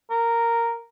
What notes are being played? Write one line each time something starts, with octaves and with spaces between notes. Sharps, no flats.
A#4